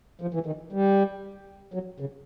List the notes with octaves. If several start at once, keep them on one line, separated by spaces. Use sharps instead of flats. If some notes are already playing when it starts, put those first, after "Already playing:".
F3
E3
D#3
G3
F#3
C#3